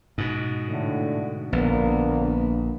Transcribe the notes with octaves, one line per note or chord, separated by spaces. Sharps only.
G#2 B2
A2 D3
A#1 D3 A#3 B3